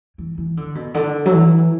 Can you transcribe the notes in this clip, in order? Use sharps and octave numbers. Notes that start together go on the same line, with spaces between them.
E3
E3
D3
B2
D3
F#3
E3